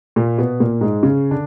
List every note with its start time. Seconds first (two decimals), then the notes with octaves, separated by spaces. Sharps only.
0.16 A#2 A#3
0.38 B2 B3
0.60 A#2 A#3
0.81 G#2 G#3
1.03 C#3 C#4
1.31 D3 D4